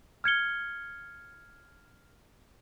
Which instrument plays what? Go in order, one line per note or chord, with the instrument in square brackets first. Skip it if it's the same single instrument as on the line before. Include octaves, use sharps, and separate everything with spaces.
[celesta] F6 G#6 C#7 G7